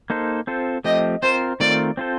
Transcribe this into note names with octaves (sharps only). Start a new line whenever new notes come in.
A#3 D#4 A4 C5
C4 F4 A4 C5
F3 A3 C4 G4 D#5
C4 F4 A#4 C5
D#3 A3 C4 F4 A#4 D5
C4 F4 A4 C5